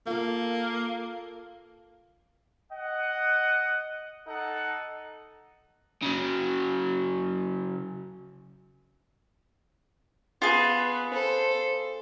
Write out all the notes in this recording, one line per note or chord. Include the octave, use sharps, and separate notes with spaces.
A#3 F4 A4
D#5 F#5
D#4 A4 F#5
C#3 F#3
B3 F4 G#4
A4 C5